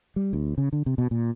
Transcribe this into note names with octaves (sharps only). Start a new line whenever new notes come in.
G3
D2
C#3
D3
C3
B2
A#2